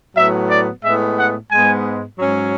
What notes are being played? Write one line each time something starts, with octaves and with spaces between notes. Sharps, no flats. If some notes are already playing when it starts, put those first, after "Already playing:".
A2 F#3 B3 E5
D5
A2 G#3 B3 E5
F#5
G#2 G#3 B3 G#5
G#2 F#3 C#4